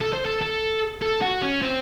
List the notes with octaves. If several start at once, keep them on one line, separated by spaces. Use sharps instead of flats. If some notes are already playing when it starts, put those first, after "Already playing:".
A4
C5
A4
A4
A4
F#4
C#4
C4